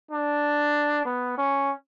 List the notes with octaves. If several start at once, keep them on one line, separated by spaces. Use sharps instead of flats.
D4
B3
C#4